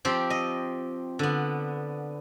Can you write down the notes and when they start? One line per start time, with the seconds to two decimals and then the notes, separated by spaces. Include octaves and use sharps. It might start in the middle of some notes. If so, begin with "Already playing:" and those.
0.05 F3 C4 G4
0.30 D#5
1.19 D3 B3